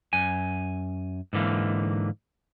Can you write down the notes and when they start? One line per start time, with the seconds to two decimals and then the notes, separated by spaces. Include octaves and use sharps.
0.13 F#2 G#5
1.33 G#2 D3 E3 A#3